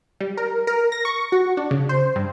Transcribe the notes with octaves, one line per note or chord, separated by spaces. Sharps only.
G3
A#4
A#4
A#6
C#6
F#4
D4
C#3
C5
G2